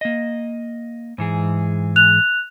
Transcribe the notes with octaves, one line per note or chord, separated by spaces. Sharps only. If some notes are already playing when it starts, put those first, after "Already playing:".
A#3 D#5
G#2 E3 G#4
F#6 F7